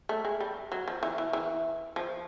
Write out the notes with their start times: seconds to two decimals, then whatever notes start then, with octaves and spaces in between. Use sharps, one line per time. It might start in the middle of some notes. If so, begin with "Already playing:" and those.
0.09 A3
0.25 G#3
0.41 G3
0.72 F#3
0.88 F3
1.03 E3
1.18 E3
1.33 E3
1.96 F3